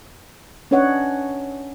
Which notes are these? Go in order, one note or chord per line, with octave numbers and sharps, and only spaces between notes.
C#4 D4 B4 C#5 D#5 F#5